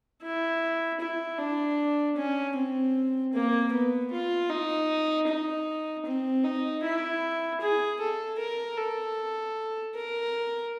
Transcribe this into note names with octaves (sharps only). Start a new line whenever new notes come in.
E4
E4
D4
C#4
C4
A#3
B3
F4
D#4
D#4
C4
D#4
E4
G#4
A4
A#4
A4
A#4